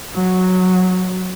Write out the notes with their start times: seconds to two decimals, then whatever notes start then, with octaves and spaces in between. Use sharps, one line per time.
0.16 F#3